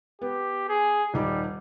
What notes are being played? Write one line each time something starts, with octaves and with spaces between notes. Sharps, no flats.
B3 G4
G#4
D#1 G3 D#4 D6